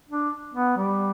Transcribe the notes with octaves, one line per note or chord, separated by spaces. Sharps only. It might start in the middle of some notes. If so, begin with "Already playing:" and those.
D4
B3
G3